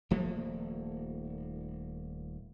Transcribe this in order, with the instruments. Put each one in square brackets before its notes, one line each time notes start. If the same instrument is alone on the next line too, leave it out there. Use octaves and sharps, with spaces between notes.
[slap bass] D#1 F3 A3 A#3